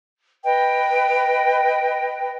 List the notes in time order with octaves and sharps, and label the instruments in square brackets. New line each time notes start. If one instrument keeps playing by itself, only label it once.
[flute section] B4 D#5 G5